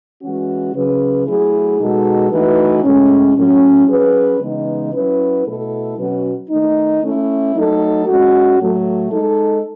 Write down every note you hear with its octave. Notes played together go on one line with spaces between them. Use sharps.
E3 G#3 C#4 F#4
C#3 F#3 C#4 G#4 B4
F#3 A3 E4 G#4
B2 G#3 D#4 F#4 A4
E3 A3 D#4 F#4 B4
A2 G#3 C#4
A2 F#3 C#4
F#3 C#4 G#4 B4
C#3 E3 G#3 B3 D#4
F#3 C#4 E4 B4
B2 A3 E4 A4
B2 F#3 C#4 F#4 B4
D#3 A3 D#4
A3 C#4 E4
F#3 A3 D#4 A4
G#3 C#4 F#4
A2 F#3 A3
G#3 D#4 A4